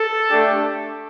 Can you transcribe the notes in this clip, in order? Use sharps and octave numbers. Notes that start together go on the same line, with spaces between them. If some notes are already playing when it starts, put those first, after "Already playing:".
Already playing: A4
A3 D4 G4